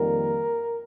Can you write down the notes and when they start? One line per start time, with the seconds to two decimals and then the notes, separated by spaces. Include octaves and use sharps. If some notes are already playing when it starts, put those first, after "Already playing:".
Already playing: F2 D#3 G3 A#3 A#4